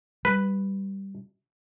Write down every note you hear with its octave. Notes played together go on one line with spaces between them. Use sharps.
G3 B4